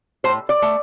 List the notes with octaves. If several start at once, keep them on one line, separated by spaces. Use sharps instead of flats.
A2 C5
D5
A3